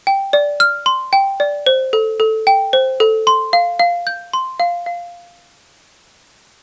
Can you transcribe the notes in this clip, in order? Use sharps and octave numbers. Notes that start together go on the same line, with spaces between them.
G5
D5
F6
C6
G5
D5
C5
A4
A4
G5
C5
A4
C6
F5
F5
G6
C6
F5
F5